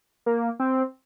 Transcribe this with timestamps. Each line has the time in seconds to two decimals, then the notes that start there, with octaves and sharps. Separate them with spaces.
0.26 A#3
0.60 C4